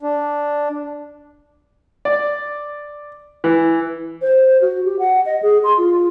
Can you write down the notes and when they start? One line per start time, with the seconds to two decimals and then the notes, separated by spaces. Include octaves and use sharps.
0.03 D4
2.05 D5
3.44 E3
4.22 C5
4.61 F#4
4.85 G4
4.99 F#5
5.26 D#5
5.42 G#4
5.64 C6
5.78 F4